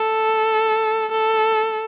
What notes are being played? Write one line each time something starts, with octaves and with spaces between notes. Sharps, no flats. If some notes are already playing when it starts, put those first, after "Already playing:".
Already playing: A4
A4